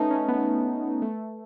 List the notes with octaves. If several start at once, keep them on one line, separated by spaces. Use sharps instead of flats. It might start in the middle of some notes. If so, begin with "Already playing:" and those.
Already playing: A3 C#4 D#4 B4 E5 A5
C#4
B3
A3